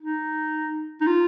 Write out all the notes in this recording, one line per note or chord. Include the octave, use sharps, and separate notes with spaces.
D#4
D#4
F4